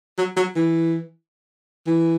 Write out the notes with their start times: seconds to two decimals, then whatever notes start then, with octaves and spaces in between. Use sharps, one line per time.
0.18 F#3
0.36 F#3
0.56 E3
1.87 E3